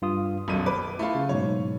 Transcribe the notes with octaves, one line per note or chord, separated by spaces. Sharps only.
G2 F4 D#6
D#1 B1 F#2 F#3 D#7
B4 D6
A3 E4 F4
C#3
G#2 B2 F#3 C#5